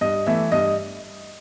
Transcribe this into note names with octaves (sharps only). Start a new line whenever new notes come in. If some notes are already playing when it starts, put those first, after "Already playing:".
G2 D#5
E3 A3 E5
G2 D#5